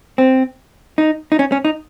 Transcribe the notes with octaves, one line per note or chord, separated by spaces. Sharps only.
C4
D#4
D#4
C#4
C#4
D#4